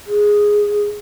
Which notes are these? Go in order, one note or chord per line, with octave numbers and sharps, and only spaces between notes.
G#4